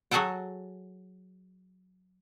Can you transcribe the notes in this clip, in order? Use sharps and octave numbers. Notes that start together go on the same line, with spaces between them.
F#3 F#4 G#4 A4 F#5 G5